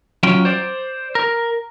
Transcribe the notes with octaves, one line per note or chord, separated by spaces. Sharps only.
F#3 C#4 F4 G5
C5 D5
A#4